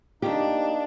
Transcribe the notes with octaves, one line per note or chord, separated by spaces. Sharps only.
A#3 D4 D#4 G4